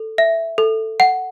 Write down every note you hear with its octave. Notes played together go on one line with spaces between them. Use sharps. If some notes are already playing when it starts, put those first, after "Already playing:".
Already playing: A4
E5
A4
F#5